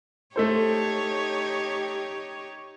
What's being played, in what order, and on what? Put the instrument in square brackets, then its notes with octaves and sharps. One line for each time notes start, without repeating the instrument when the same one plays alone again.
[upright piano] A3 A4 C5 [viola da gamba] D#4 G4 C#5